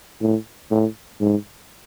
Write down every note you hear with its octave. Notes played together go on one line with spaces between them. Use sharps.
A2
A2
G#2